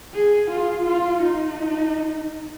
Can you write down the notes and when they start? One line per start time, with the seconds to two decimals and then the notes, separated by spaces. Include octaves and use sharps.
0.14 G#4
0.50 F4
0.86 F4
1.22 D#4